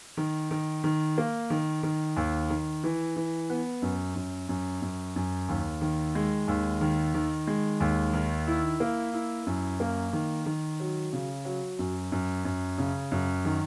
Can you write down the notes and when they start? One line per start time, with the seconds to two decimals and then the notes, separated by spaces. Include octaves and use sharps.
0.17 D#3
0.51 D#3
0.84 D#3
1.18 A#3
1.50 D#3
1.83 D#3
2.17 D#2
2.50 D#3
2.84 E3
3.16 E3
3.50 B3
3.82 F#2
4.16 F#2
4.49 F#2
4.82 F#2
5.16 F#2
5.49 D#2
5.81 D#3
6.15 G#3
6.48 D#2
6.81 D#3
7.14 D#3
7.47 G#3
7.80 D#2
8.13 D#3
8.47 E4
8.80 A#3
9.14 E4
9.47 F#2
9.80 A#3
10.13 D#3
10.46 D#3
10.80 F#3
11.13 C#3
11.45 F#3
11.79 F#2
12.12 F#2
12.45 F#2
12.78 C#3
13.12 F#2
13.45 D#3